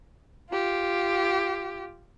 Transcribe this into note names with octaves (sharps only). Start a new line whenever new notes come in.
F4 G4